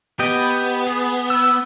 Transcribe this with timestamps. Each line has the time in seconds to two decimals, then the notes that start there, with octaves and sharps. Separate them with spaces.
0.19 B3 G4 D#5 G5
0.87 G#4
1.30 E6